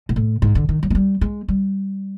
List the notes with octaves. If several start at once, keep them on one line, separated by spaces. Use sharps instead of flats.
G#2
A2
G#2
D3
D#3
F#3
G#3
G3
G#3
G3